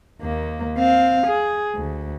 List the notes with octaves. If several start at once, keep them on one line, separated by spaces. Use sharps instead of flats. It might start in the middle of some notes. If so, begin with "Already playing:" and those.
D#2 A#3
C4 F5
G#4
D2